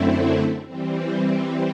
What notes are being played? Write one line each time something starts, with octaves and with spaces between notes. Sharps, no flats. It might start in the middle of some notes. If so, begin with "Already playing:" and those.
Already playing: F#2 D3 A3 C4 E4
E3 G3 C4